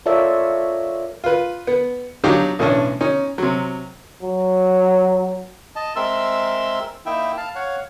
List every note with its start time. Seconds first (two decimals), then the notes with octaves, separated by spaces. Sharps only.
0.06 F4 A4 A#4 C#5 D5 E5
1.24 F4 B4
1.67 B3
2.24 F#3 D4 D#4 G4 F5
2.59 B1 A2 E3 C#4 D4
3.01 C#4 D#4
3.38 C3 F#3
4.23 F#3
5.76 D#5 A5
5.96 G#3 C4 A#4 E5 C6 E6
7.06 A#3 D#4 E4 E5 G5
7.37 F5 A5
7.55 C#5 F5 F#5